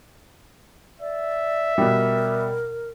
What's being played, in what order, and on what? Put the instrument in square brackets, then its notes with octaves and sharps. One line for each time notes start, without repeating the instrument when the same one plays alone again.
[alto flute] D5 [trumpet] E5
[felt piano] B2 G3 [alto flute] A#4